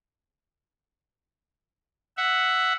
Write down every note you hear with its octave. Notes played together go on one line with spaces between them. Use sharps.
E5 F#5